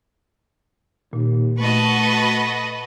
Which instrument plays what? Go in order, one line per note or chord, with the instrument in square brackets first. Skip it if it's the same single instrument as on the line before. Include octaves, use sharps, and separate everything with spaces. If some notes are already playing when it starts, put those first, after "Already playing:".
[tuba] D#2 [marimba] A#2
[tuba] A3 [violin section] F#4 A5 C#6 [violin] B4 D#5